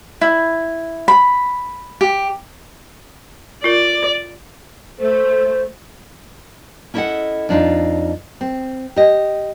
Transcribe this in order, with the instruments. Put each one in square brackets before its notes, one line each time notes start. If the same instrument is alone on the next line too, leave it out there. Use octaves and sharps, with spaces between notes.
[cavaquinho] E4
B5
G4
[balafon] F4 A#4 [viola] D5
[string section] A3 [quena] C5
[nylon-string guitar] C#4 E4 A4 C#5 D#5 F#5
F2 D4 D#4 F4
C4
G4 D#5